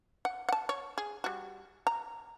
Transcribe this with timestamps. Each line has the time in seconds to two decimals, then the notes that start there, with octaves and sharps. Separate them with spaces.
0.25 F#5
0.49 F#5 A5
0.69 C#5
0.98 G#4
1.24 G3 F#4
1.87 A#5